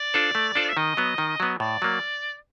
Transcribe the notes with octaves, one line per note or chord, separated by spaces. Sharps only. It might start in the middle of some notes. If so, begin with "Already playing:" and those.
Already playing: D5
D4 F4 A4 C5
A3
D4 F4 A4 C5
E5
D#3 D#5
F#3 B3
D#3
F#3 B3
A2 D5
F#3 A#3